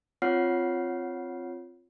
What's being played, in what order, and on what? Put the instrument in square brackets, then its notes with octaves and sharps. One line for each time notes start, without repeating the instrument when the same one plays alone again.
[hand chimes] C4 F4 C#5 F#5 F6 C7